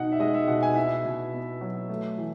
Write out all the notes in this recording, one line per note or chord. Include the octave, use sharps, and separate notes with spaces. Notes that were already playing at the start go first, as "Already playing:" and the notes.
Already playing: B2 D#4 F#5
E5
G#3 D#5
E5
B2 F#5
G#5
E4 E5
B2
B3
F#3
A3
E3